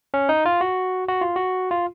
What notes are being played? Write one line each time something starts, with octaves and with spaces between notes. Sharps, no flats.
C#4
D#4
F4
F#4
F#4
F4
F#4
F4